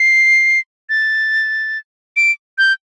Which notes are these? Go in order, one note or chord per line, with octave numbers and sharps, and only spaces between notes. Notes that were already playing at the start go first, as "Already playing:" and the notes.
Already playing: C7
A6
D7
G6